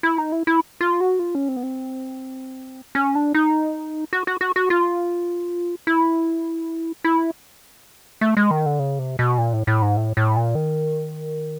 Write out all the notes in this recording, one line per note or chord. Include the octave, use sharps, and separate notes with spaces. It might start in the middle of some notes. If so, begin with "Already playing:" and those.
E4
D#4
E4
E4
F4
F#4
F4
C#4
C4
B3
C4
C#4
D4
D#4
F#4
F#4
F#4
F#4
F4
E4
E4
A3
G#3
D#3
D3
C#3
C3
B2
A#2
A2
A2
G#2
A2
A2
A#2
D#3